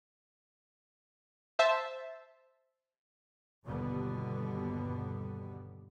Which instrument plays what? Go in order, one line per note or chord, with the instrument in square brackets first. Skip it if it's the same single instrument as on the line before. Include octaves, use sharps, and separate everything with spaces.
[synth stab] C5 E5 A5
[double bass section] G1 D#2 B2 D3 G3 B3